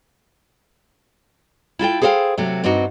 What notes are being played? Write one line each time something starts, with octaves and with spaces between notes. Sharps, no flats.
E4 F4 A4 G5
G#4 A4 C5 D5 F5 G5
C3 F#3 A3
G2 C4 D4 D#4 F#4